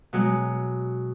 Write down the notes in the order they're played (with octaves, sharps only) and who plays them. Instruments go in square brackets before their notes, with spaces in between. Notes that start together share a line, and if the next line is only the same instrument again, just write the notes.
[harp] B2 F#3 G#3